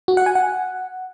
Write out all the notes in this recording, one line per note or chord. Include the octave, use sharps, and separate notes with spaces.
F#4
F#5
G#5
F#5